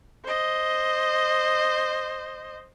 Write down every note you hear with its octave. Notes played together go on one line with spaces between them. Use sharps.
C5 D#5